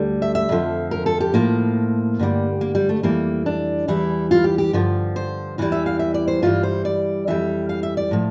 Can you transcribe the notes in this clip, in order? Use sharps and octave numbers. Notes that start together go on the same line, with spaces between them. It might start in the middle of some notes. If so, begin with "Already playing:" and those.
Already playing: D2 D3 G3
E5
E5
F2 D3 F3
A#4
A4
G4
A2 F3 A#3
G2 D3 G3
A#3
G3
A3
F2 E3 G3 A#3
D4
E2 E3 G3 E4
F4
G4
G4
G2 D3 F3
C5
E2 E3 G3
E5
F5
E5
D5
C5
G2 E3 G3 F4
C5
D5
F2 E3 G3 E5
F5
E5
D5
A2 F3